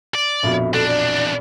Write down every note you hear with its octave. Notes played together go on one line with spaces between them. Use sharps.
D5
A#1 F2 B2 E5
E2 D4 A4
D5